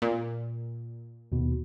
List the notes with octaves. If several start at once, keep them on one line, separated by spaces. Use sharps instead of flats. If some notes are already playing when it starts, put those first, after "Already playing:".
A#2
D#2 B2